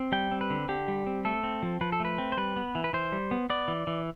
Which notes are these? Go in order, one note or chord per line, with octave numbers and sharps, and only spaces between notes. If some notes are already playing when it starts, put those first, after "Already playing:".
Already playing: C4
G3 G5
C4
B4
D3
D3 G4
G3
C4
A3 A4
C4
F3
F3 B4
A4
A3 B4
C4
C5
G3 B4
B3
E3
B4
E3 C5
G3
B3
B3 D5
E3
E3